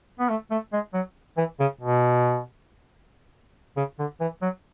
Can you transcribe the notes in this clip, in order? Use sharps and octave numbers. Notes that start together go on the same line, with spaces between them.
B3
A3
A3
G#3
F#3
E3
C#3
B2
C#3
D3
E3
F#3